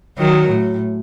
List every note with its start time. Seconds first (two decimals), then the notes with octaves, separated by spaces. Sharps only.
0.18 D#3 F#3
0.48 A2